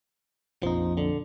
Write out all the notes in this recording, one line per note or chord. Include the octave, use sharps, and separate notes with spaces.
A#1 F2 F3 D#4
D3